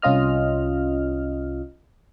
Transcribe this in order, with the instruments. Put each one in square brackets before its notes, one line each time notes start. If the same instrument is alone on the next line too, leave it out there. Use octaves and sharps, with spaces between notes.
[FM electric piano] C2 C#4 F4 D#5 F6